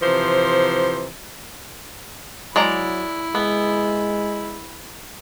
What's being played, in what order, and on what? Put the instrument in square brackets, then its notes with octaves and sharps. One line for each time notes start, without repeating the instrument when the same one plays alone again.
[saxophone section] C3 E3 F3 C5
[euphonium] F#3 [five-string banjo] G#3 D5 A#5 [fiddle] E4
[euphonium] G#3 [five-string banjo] B3